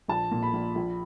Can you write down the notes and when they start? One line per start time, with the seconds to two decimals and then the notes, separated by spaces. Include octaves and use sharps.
0.08 A#1 A5
0.32 A#2
0.43 B5
0.53 A#1
0.75 A#1